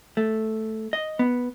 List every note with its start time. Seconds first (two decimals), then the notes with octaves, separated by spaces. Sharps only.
0.17 A3
0.93 D#5
1.19 B3